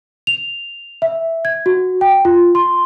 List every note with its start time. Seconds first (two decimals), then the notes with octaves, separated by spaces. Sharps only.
0.27 F7
1.02 E5
1.45 G#6
1.66 F#4
2.01 G5
2.25 F4
2.55 C6